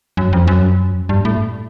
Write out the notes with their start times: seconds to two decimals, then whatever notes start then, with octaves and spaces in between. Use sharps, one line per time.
0.17 F#2
0.33 F2
0.47 F#2
1.09 G2
1.25 A2